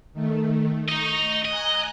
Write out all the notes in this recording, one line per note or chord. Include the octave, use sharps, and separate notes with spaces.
D#3 A3
D#4 D#5 C#6 A#6
D#5 G#5 A#5 F#6